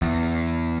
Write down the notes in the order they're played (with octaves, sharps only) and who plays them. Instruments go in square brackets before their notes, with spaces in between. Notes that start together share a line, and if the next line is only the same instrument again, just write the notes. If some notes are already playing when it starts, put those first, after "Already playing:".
[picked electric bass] E2